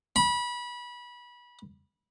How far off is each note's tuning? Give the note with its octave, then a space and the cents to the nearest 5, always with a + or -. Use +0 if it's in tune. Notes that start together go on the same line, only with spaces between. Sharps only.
B5 -25